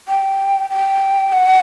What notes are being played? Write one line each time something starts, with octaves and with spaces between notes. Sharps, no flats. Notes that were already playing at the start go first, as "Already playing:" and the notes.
G5
G5
F#5